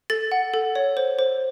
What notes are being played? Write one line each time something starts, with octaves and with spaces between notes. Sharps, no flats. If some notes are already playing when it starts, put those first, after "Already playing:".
A4 A6
F#5
A4
C#5
C5
C5